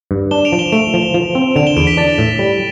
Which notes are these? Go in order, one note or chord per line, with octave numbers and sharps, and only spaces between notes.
G2
D4 E7 G7
D7 F7
F3
E7 G7
A3 D7 F7
F3
F3
C4
D3 D7 F7
E7 G7
E2 D7 F7
B6 D7
D4 A6
A2
G3